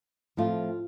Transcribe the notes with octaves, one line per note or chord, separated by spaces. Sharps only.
A2 F3 A3 C4 F4